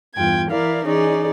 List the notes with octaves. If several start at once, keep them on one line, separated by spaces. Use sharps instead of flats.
E2 G2 F4 G5 G#6
E3 E4 A#4 D5 F5
E3 C#4 D#4 G#4 D5